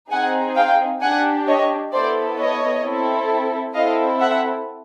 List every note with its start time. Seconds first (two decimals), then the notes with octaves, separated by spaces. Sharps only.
0.11 C4 D#4 G#4 F#5 G#5
0.56 F5 G5
1.02 D4 G4 F#5 G#5
1.47 C#5 D#5
1.93 B3 E4 A4 C5 D5
2.38 C#5 D#5
2.84 C4 E4 A4
3.74 C4 E4 A4 D#5 F5
4.20 E5 F#5